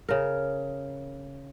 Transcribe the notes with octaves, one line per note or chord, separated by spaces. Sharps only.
C#3 A#4